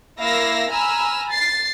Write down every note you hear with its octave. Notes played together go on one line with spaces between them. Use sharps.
A#3 E4 F5 E6 A#6
G#5 A#5 B5 E6 F6
A6 C7